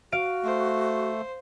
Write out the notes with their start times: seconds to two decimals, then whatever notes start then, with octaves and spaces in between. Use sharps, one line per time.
0.12 F#4 F5 D7
0.44 A3 C5